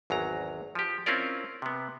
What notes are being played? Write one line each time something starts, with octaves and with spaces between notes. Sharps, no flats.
G#1 E2 F#3 A#5
F3 G4
C4 C#4 E4 F4 A#4 D5
C3 B3